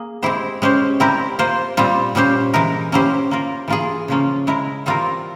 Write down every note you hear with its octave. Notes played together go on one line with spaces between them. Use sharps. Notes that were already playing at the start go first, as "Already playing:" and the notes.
Already playing: A#3 G#4
G#3 C4 E4 G4 C5
G#3 C#4 G4 C5
G3 C4 E4 G4 A#4
A#3 F4 C5
A#2 G3 C4 F4
A#2 G3 C#4 G4 C5
E3 G#3 E4 A#4
A#3 C#4 E4 G4 C5
A#3 F4 A#4
E3 A#3 F4 G#4
C#3 F3 A#3 C#4 F4
G#3 E4 A#4
E3 G3 C4 F4 A#4